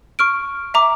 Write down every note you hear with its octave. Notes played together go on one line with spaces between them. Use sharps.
C#6 F6 D7
E5 A#5 D6